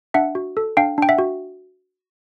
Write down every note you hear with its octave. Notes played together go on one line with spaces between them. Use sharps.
D4 E5 F#5
F#4
A4
D4 F5 G5
D4 G5
E5 F#5
F#4